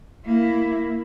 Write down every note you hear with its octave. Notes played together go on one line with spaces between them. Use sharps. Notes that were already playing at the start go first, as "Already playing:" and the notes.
A#3 E4